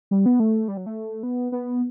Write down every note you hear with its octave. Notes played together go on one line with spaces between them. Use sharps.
G3
B3
A3
G3
F#3
A3
B3
B3